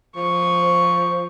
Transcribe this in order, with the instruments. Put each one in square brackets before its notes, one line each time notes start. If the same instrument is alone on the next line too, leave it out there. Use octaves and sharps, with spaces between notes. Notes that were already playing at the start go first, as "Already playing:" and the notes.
[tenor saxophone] F3 [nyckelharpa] C#6
[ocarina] C5